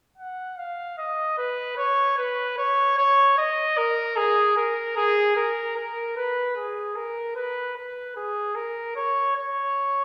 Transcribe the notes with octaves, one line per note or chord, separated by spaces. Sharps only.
F#5
F5
D#5
B4
C#5
B4
C#5
C#5
D#5
A#4
G#4
A#4
G#4
A#4
A#4
B4
G#4
A#4
B4
B4
G#4
A#4
C#5
C#5